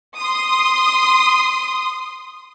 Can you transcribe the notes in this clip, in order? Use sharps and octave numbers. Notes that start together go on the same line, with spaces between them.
C6 D#6